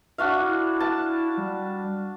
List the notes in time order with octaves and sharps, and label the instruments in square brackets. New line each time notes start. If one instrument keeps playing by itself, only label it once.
[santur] D4 F#4 F5 [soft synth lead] E5
[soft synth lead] E4
[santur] A5
[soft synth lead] G3